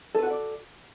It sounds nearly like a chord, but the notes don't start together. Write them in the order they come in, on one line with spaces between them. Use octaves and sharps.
A4 B4 F#4 F#5 D5